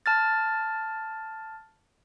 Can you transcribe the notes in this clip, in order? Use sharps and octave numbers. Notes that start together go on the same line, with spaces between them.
A5 F6 A6